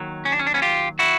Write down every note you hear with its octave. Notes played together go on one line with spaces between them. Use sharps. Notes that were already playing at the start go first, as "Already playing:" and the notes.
Already playing: D#2 D#3 F#3
C#4
D4
C#4
D4
B3 C#4
F4 G4
E4 F#4